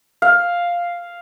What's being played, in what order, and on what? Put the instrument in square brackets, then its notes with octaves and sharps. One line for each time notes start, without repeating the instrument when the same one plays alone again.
[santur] F5